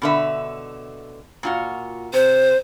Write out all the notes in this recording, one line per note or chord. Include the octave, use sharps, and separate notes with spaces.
B2 D3 E5
A#2 F4 F#4
C3 C5